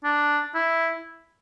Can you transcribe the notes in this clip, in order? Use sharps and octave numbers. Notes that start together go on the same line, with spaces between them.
D4
E4